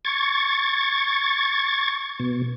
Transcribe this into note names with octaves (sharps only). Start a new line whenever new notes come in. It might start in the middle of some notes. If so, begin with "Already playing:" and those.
C#6 G#6 A6
B2